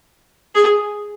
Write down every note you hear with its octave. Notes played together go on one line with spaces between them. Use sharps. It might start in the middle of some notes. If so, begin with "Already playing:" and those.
G#4